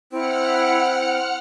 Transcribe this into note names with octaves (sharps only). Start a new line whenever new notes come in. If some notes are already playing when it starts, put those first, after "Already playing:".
C4 E4 F#5 F6 C#7